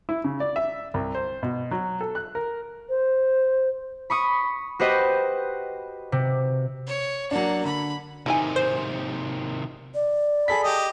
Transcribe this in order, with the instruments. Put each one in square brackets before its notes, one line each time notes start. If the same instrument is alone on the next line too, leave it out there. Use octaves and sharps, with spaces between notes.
[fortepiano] E4
C#3
D5
E5
C2
C5
B2
F#3
A4
F#6
A#4
[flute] C5
[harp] B5 C#6 D#6
F#4 G4 B4 C5 D#5 F#5
C3
[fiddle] C#5
[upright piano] F#3 D4 [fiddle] A#3 F#5
[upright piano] D3 [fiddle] B5
[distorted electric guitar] C3 D#3 [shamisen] D#4 E4 G#5
[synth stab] C5
[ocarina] D5
[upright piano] G#4 A4 B6 [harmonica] B5
[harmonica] G4 D#5